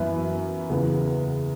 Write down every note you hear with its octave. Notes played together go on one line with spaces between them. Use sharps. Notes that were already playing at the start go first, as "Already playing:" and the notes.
Already playing: F#2 E3 B3 B4 E5
E2 C#3 E3 B3